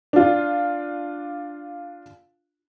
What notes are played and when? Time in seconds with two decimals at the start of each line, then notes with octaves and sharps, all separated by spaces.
0.13 D4 F4